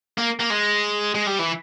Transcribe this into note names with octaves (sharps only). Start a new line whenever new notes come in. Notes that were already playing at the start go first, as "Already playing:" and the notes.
A#3
A#3
G#3
G#3
G3
E3